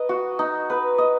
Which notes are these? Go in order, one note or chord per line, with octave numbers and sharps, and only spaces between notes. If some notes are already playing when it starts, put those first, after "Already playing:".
Already playing: D#4 B4 D#5
F#4
D#4
B4
D#5